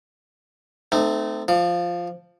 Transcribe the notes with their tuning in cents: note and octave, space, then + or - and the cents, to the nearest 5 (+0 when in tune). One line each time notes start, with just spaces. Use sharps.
A3 +0 C4 -30 D#4 -30
F3 +0 D5 +30